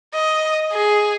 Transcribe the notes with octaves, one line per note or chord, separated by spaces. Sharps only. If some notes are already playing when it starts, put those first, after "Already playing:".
D#5
G#4